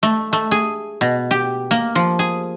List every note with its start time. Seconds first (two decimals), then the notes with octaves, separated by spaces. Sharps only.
0.03 A3
0.33 A3
0.51 G#4
1.01 B2
1.31 G4
1.71 A#3
1.95 F3
2.19 G#4